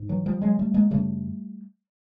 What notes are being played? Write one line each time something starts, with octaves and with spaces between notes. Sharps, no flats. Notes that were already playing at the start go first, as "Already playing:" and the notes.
Already playing: G#2
E3 F#3
F3 G3
F#3 G#3
G3 A3
G#3 A#3
F#2 C#3 G3 A3